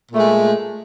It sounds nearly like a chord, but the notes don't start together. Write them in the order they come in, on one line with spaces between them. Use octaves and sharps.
A#2 A3 G#3